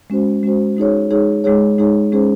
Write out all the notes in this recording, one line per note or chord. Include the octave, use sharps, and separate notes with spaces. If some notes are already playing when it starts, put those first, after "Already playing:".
G#3 C#4 F#4 C5
G#3 C#4 F#4 C5
G#3 D#4 G#4 C#5
G#3 D#4 G#4 C#5
G#3 D#4 G#4 C#5
G#3 D#4 G#4 C#5
G#3 C#4 G#4 C5